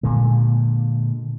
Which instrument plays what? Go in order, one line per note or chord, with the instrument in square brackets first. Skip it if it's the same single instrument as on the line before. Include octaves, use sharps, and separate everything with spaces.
[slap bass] A#2 D3 G#3